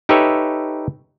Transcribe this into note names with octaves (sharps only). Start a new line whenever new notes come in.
D#4 G4 A4 B4 C#5 E5